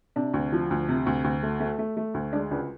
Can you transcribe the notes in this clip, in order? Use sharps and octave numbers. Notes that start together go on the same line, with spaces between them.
C3 D4
D2
F3
D2
C3
D2
D2
A3
A3
A3
A3
D2
G#3 D4
C#2 D4